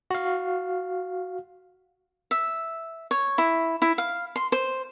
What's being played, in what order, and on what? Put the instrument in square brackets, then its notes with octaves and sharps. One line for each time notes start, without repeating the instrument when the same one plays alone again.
[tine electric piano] F#4 F5
[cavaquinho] E5
C#5
E4
E4
F5
C6
C5